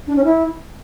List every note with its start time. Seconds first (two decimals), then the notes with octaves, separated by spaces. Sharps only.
0.07 D4
0.16 C#4
0.24 E4